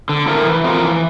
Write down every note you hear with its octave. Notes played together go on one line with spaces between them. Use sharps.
D3
A3 E4 A#4
E3
A3 C4 F4 A#4
E3